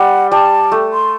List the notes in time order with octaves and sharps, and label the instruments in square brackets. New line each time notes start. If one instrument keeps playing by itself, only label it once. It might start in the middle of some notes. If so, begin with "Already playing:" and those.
Already playing: [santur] G3 [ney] F#5
[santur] G3 [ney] A5
[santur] A3
[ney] C6